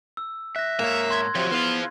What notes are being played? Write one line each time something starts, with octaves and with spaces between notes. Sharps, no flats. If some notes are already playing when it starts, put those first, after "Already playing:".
E6
E5 F#6 A#6
G#2 A#3 C#5 E5
C6 G#6
C3 F3 F#4 C#5
E2 B3 F4 B4 C5 F5